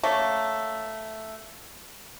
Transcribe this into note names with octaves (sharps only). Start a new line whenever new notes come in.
A3 A#3 C#4